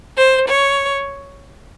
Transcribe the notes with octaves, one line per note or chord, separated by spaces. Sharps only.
C5
C#5